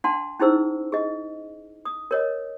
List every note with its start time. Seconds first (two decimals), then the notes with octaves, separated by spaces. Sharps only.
0.04 D4 F#5 A5 C6
0.40 C#4 D#4 E4 G#4 C5 E6
0.92 G#4 D#5
1.85 D#6
2.11 A#4 C#5 D#5